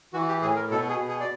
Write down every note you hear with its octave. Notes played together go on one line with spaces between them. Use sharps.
E3 F#4
G4
A2 G#4
A#4
B2 A4
G#4
B2
G#4
D5